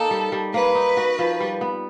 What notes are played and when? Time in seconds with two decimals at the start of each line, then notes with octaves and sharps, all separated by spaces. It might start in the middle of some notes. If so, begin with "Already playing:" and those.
Already playing: A#3 D#4 A4
0.11 G3
0.32 G3
0.54 A#3 B4
0.75 D#4
0.97 F#4
1.19 F3
1.40 G3
1.61 B3